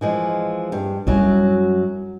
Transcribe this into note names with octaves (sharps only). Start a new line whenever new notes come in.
E3 F3 G#3
G2
F#2 F#3 G3 E4